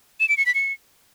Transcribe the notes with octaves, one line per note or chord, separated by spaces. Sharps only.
E7
D7
C#7
B6
C#7